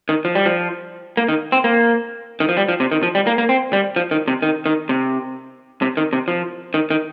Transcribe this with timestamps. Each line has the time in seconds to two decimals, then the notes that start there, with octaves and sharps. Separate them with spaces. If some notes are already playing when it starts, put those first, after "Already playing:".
0.09 D#3
0.25 F3
0.35 G3
0.46 F3
1.17 A#3
1.28 D#3
1.52 C4
1.64 A#3
2.40 D#3
2.49 F3
2.57 G3
2.69 F3
2.80 C3
2.92 D#3
3.03 F3
3.15 G3
3.27 A#3
3.38 A#3
3.49 C4
3.73 G3
3.96 F3
4.11 D#3
4.28 C3
4.42 D#3
4.66 D#3
4.89 C3
5.82 C3
5.97 D#3
6.13 C3
6.28 F3
6.74 D#3
6.90 D#3